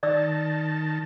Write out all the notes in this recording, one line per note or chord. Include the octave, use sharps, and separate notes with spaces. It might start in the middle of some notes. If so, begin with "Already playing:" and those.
D#3 D5 A5 D#6 E6